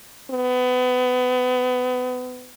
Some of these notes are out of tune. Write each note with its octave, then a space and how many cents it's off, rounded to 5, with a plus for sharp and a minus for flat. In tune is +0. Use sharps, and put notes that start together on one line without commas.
B3 +30